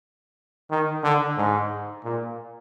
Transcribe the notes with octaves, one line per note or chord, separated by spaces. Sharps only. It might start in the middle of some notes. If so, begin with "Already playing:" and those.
D#3
D3
G#2
A#2